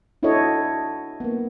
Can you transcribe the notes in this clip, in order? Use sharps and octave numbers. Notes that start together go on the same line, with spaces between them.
D4 E4 F#4 A4 C#5 D#5
A#3 B3